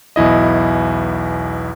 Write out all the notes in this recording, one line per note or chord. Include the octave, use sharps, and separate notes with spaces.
B1 E2 E4 D#5